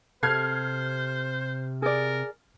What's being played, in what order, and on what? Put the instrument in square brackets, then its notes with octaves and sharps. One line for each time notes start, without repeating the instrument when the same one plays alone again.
[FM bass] C3 [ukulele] A4 [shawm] C5 [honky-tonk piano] F6 G#6 C7
[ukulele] G#4 D5 [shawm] A#4